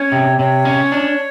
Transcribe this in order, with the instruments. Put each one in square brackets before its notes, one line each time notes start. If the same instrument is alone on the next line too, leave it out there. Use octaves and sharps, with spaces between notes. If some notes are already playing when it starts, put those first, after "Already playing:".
Already playing: [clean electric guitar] C#4 [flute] C#5
[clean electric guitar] C3
[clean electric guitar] C3 [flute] C#5
[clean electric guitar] C#4
D4